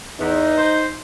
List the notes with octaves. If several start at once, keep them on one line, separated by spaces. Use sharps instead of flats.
E2 D#4
C5